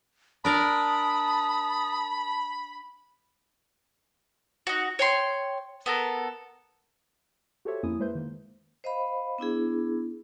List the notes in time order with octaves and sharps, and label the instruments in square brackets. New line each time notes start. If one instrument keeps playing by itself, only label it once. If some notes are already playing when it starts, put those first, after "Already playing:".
[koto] D4 A#4 D5 [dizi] A5 [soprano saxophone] B5 [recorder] D#6
[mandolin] D#4 F#4
C#5 G5 C6
B3 A4 A#4
[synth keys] F#4 G4 A4 C5 C#5 E5
F2 A#3 C#4 E4 G#5 D#6
G#3 A#3 B4 C5 E5 G6
D#3 A#3
[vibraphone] C5 D#5 F5 B5
B3 D4 E4 G#4